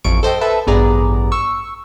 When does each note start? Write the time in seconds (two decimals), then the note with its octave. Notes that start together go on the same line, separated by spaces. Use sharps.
0.04 A1 F2 C#6 D7
0.23 A4 C5 D#5 G5
0.41 A4 B4 E5 A5
0.67 A1 G2 B3 G#4 D5 A#5
1.32 C#6 E6